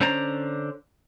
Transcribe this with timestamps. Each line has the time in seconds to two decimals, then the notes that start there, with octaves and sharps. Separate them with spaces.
0.01 D3 C#4 C5 D5 A#5